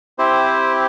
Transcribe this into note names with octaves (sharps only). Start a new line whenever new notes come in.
C4 E4 G4 C5